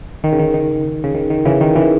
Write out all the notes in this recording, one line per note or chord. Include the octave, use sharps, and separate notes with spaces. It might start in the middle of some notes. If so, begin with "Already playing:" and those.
D#3
C#3
D#3
D#3
C#3
D#3
D#3
C#3 E3
D#3
C#3 E3